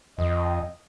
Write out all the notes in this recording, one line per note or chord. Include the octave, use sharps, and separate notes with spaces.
F2 D#5